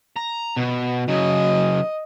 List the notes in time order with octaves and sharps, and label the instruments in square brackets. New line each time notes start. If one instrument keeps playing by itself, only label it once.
[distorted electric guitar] A#5
B2
[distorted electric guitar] C#3 F#3 [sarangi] D#5